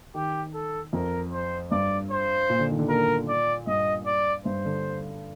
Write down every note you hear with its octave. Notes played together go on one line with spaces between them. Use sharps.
D#3 G4
A4
F2 A#4
C5
G2 D5
C5
A#2
D3
D#3
D3
A#2 A#4
D5
G2 D#5
D5
G2 C5
D3